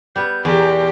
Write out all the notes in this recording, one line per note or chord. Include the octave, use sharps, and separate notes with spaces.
G3 B3 G6
E2 G4 G#4 A#4